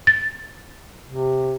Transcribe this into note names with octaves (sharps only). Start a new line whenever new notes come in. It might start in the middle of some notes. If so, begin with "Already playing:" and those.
A6
C3